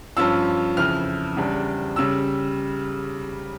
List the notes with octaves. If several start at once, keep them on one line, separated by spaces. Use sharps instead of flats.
G2 F3 C#4 F4 E6
F2 C#3 E3 F6
E2 C#3 G3 D4
C#3 G3 E6